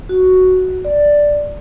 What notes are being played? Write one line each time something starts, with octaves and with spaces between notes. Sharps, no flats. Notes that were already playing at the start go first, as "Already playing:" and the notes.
F#4
D5